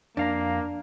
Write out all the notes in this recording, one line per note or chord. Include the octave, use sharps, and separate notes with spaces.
F2 A#3 D4 F5 A#5